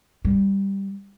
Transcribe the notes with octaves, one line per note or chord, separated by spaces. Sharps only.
G3